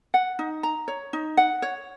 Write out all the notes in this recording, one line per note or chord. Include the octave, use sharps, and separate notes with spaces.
F#5
D#4
A#5
C#5
D#4
F#5
C#5